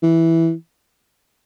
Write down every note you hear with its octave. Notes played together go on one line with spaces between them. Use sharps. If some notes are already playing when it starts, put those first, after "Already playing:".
E3